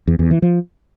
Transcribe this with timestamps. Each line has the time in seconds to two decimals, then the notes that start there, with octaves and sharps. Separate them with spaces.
0.07 E2
0.19 E2
0.31 E3
0.42 F3